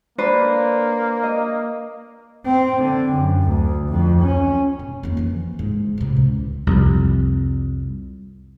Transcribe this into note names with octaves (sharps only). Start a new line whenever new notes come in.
A#3 D4 B4 C5
D#5
C4
D3
F#2
D2
F2
C#4
B2
F2 A#3
E3 F3
G#2
A2 C3
C#2
C2 F2